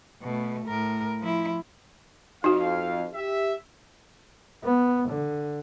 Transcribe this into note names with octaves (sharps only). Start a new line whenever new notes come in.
B2 A3
A2 A#4
F3 E4
F2 D#4 F#4 F5
G4 E5
B3
D3